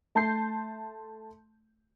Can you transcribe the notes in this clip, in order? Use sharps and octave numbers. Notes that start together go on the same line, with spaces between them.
A3 A5 C6 G6 C7